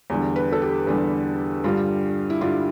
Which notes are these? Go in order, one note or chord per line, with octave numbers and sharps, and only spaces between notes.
E2 D3 G3
B4
A4
G4
E2 D3 G3
G2 D3 G3 F4
E4
G2 D3 G3 F4